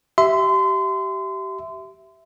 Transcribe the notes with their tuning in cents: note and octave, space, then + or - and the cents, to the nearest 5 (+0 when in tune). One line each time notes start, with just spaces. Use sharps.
G4 -30 E5 +0 C6 -30